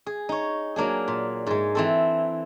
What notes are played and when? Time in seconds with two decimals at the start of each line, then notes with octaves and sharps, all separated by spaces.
0.06 G#4
0.29 D#4 C#5
0.76 F#3 A#3 D4 G#4
1.08 A#2
1.46 G#2 G#3
1.75 E3 C4 A4